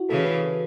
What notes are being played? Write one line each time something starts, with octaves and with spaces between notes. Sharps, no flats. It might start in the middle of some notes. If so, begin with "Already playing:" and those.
Already playing: E4 F#4
C#3 E3 A4
B4
B4